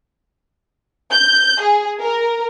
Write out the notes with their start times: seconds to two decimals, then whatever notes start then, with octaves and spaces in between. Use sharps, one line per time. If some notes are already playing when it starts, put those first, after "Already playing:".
1.11 G6
1.61 G#4
2.01 A#4